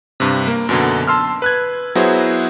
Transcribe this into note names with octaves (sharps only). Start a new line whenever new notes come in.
G2 C3
A#3
F#2 B2 D3
A5 C6 E6 F6
B4 F#6 G#6
F#3 B3 E4 F#4 G#4 C5